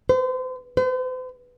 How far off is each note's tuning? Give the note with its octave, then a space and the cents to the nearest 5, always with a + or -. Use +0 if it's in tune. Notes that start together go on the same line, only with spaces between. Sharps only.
C5 -35
C5 -45